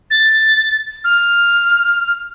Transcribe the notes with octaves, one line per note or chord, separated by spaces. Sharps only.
A6
F6